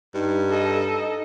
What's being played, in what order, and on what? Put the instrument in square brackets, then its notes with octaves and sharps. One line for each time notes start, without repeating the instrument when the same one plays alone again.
[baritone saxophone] G2 [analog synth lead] D#4
[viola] A4 D#5